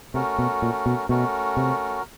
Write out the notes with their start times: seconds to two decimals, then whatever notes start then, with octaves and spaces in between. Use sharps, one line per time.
0.14 C3 A3 C#4 F#4 A#4
0.38 B2
0.62 A#2
0.86 B2
1.08 B2 A3 C#4 F#4 A#4
1.57 C3